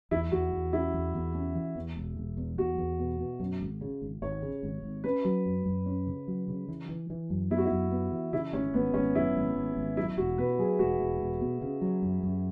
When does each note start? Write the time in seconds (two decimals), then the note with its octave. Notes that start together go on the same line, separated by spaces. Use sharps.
0.11 E2 E4
0.32 E2 F#4
0.53 E2
0.73 C#4 E4
0.94 E2
1.15 E2
1.35 C#4
1.55 E3
1.76 E2
1.96 E1
2.17 E1
2.37 E2
2.58 E2 F#4
2.78 E2
2.99 B2
3.20 B2
3.40 F#2
3.61 G#1
3.81 C#3
4.02 G#1
4.22 G#1 C#5
4.42 C#3
4.63 G#1
4.83 G#1
5.04 C#4 B4
5.25 F#3
5.46 F#2
5.66 F#2
5.86 C#4
6.07 C#3
6.28 F#3
6.48 C#3
6.68 E3
6.89 E3
7.10 E3
7.30 F#2
7.50 B3 E4
7.58 F#4
7.65 E4
7.71 F#2
7.91 B3
8.12 E3
8.33 C#3 E4
8.53 G#1 C#4
8.74 G#1 B3
8.94 G#1 C#4
9.15 F#2 E4
9.36 G#1
9.56 G#1
9.77 G#1
9.97 F#3 E4
10.17 E1 F#4
10.38 B2 B4
10.59 F#3 G#4
10.79 E1 F#4
11.00 E1
11.20 E1
11.41 B2
11.62 C#3
11.81 F#3
12.02 F#2
12.23 F#2